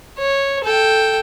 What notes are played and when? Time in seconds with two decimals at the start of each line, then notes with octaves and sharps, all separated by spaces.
0.18 C#5
0.64 A4 G5